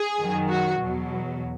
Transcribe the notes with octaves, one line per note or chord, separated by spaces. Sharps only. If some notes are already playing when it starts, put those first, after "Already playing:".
Already playing: G#4
F#2 D#3 F#3
F#4
E2 B2 F#3